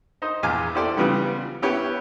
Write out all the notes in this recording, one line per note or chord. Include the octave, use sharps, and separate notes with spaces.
D#4 C5 D#5
A#1 E2 F5 G#5 D6
E4 G4 A4 C5 D5
C#3 E3 F3 G3 B3
B3 C#4 E4 G4 B4 C#5